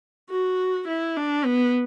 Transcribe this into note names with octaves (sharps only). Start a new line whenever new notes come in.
F#4
E4
D4
B3